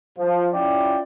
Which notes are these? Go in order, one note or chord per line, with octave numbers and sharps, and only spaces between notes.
F3
C#4 E4 F4 D5 G5